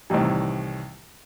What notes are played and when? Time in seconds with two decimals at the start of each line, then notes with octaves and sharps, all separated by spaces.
0.10 C2 A2 D#3 E3 G3